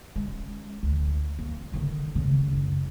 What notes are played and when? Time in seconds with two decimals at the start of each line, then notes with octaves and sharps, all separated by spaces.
0.16 G#3 C#4
0.83 D2
1.39 A#3
1.73 D3 D#3
2.15 C#3
2.53 F#1